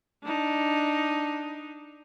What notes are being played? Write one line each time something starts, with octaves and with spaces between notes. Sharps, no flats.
D4 D#4